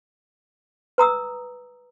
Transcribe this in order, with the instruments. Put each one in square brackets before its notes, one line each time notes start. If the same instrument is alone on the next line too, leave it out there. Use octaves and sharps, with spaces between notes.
[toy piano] B4 A#5 D#6 E6